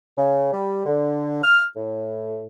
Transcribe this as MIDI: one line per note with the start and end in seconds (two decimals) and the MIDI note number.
0.16 0.49 49
0.51 0.81 55
0.85 1.39 50
1.42 1.63 89
1.75 2.46 45